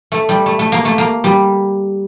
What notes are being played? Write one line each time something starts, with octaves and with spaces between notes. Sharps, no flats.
A3
G3
A3
A3
A#3
A3
A#3
G3